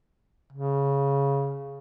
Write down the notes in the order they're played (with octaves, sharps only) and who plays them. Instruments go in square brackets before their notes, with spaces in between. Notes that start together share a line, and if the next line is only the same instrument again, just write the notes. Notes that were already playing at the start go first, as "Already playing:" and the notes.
[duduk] C#3